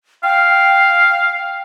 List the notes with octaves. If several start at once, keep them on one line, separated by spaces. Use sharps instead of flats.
F5 G5